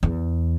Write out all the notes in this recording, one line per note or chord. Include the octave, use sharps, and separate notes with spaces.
E2